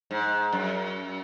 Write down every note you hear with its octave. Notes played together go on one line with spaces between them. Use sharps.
G#2
F#2